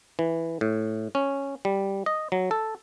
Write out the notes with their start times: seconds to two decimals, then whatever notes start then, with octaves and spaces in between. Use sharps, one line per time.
0.19 E3
0.61 A2
1.15 C#4
1.65 G3
2.06 D#5
2.32 F#3
2.51 A4